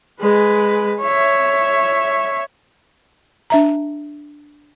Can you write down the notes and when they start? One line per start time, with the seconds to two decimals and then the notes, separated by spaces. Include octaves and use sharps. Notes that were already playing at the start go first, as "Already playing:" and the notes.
0.21 G#3 B4
1.01 C#5 E5
3.50 D4 E5 A#5